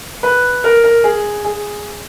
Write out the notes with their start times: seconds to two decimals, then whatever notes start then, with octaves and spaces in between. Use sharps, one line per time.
0.23 B4
0.64 A#4
0.84 A#4
1.04 G#4
1.44 G#4